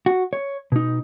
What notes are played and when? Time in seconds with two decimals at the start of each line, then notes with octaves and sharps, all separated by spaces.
0.06 F#4
0.33 C#5
0.72 B2 D#4